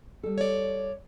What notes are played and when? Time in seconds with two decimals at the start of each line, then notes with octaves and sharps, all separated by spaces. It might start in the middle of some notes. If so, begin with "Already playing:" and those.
0.23 G3 A4
0.38 C#5 D5